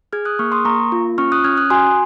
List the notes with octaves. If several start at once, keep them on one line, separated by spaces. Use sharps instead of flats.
G#4 F6 G#6
D#6 F#6
A#3 C#6 F6
C6 D#6
A#3 A#5 C#6
F4
C#4 C#6 F6
D#6 F#6
C#4 F6 G#6
D#6 F#6
F#4 G#5 C6